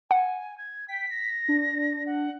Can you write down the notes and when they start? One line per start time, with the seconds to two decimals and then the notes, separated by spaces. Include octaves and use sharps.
0.11 F#5 G#5
0.58 G#6
0.88 G5 B6
1.10 A#6
1.48 D4
2.06 F#5